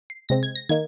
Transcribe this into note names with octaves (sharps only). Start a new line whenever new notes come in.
C7
C3 G#3 C4 A#6
G#6
A#6
D#3 A#3 D#4 G#6